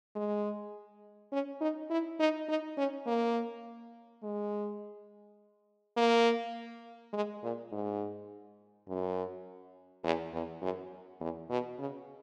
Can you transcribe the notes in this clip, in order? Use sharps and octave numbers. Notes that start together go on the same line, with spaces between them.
G#3
C#4
D#4
E4
D#4
D#4
C#4
A#3
G#3
A#3
G#3
A#2
G#2
F#2
E2
E2
F#2
E2
B2
C#3